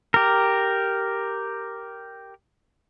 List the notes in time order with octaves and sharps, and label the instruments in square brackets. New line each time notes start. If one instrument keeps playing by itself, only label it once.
[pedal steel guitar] G4 A#4